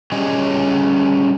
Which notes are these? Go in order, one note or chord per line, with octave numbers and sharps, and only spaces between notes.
G3 C#4 G4 G#4 C#5 D#5